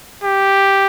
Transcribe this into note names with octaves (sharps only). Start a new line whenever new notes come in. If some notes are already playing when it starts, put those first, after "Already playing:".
G4